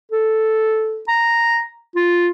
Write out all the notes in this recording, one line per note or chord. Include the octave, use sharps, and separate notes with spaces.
A4
A#5
F4